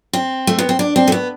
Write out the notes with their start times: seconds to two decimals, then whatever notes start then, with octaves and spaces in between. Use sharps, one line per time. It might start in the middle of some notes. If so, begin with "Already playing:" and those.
0.13 C4
0.47 A3
0.58 B3
0.69 C4
0.79 D4
0.96 C4
1.07 A3
1.12 B3